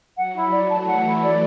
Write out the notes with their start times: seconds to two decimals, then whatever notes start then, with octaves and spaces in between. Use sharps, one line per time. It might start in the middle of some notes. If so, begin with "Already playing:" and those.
0.16 F#3 F#5
0.34 E4
0.51 D5
0.69 E3 A3 A5
0.86 F#5
1.05 E4
1.22 D5